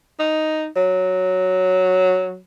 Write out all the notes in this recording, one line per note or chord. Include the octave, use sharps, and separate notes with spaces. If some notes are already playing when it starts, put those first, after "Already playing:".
D#4
F#3